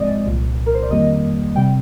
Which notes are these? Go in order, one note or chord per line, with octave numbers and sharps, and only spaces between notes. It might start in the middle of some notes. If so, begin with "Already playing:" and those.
Already playing: G#2 F3 G#3 C4 D5 D#5
C2 A#2 F3
A#4
C5
D5
F2 D#3 G3 A#3 D#5
C3 G3 G5